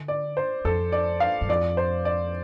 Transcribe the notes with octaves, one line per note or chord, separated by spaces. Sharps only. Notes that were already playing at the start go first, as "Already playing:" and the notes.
Already playing: D3
D5
C5
F2 A4
D5
F5
G2
F2 D5
C5
D5